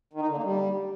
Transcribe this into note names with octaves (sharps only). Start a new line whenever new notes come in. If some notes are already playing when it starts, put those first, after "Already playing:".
D#3
D#4
D3
A#3
G3